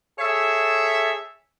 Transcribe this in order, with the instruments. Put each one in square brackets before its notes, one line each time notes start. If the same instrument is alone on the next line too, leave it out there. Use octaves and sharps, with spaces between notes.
[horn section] G#4 A4 C#5 E5